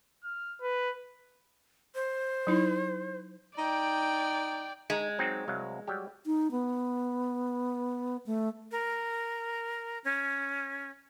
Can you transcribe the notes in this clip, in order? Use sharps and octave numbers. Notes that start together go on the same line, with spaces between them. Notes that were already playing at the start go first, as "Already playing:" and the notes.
F6
B4
C5
F#3 D#4 E4
D#4 D5 G5
G#3 D#4
F#3 C4 D#4
C2 F#3 F5
F#3 G3 G4
D#4
B3
A3
A#4
C#4